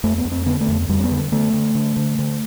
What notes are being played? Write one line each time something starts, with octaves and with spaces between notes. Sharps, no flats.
F2 A3
B3
F2
C4
D3 B3
A3
F2
F2 G3
C4
B3
D3
D3 A3
D3
D3
D3
D3